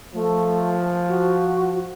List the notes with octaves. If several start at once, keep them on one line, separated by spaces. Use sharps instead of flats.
F3 A3
F#4